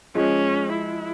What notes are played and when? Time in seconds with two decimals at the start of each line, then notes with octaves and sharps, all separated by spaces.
0.15 F3 G#3 C#4
0.73 E4